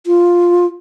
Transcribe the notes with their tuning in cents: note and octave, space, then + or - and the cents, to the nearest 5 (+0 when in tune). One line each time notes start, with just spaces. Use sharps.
F4 +5